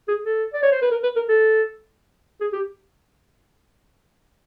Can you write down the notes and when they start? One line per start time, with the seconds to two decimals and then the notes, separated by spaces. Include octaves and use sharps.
0.08 G#4
0.25 A4
0.54 D5
0.63 C#5
0.72 C5
0.82 B4
0.92 A#4
1.04 B4
1.16 A#4
1.29 A4
2.41 G#4
2.53 G4